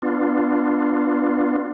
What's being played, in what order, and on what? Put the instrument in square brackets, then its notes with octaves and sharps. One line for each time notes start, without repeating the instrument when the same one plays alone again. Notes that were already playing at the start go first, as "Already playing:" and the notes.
[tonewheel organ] B3 D4 F4